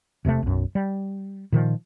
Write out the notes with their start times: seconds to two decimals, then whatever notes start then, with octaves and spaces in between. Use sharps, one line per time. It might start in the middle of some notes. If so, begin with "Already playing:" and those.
0.25 E1 C3 G#3 A3
0.42 B1 F#2
0.75 G3
1.52 A#2 D#3 F3